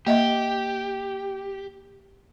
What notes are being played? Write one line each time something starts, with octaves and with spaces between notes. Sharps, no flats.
A#3 G4 D#5 E5